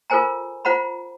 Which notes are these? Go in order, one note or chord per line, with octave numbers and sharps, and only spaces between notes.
F4 A4 A#4 C5 G#5 A#5
F4 C5 F#5 A#5 B5